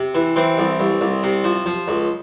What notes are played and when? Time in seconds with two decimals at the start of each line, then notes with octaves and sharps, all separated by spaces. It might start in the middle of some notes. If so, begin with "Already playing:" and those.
Already playing: C3
0.15 E3
0.36 E3 C4
0.58 C2
0.80 C2
1.01 C2
1.23 C3
1.44 F3
1.66 F3
1.88 C#2